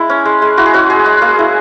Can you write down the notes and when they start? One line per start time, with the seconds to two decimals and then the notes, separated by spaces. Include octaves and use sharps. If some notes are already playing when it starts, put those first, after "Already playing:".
Already playing: G#3 E4
0.10 C#4
0.25 G#3
0.42 G#3
0.57 E4 F#4
0.66 G#4
0.74 C#4 F#4
0.90 G#3 G#4
1.06 G#3
1.21 A#3 G#4
1.39 E4